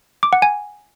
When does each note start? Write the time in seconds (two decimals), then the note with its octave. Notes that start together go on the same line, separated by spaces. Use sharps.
0.23 D6
0.33 F#5
0.42 G#5